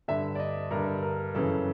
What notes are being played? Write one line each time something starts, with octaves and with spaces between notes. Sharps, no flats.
G2 D3 E5
D5
D#5
G2 D3 A#4
A#4
F#2 C#3 E3 A4